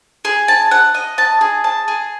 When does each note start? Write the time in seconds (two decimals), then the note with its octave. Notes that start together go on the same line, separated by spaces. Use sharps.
0.25 G#4
0.48 A5
0.71 F#5
0.94 D#5
1.18 A5
1.41 G#4
1.64 A5
1.88 G#4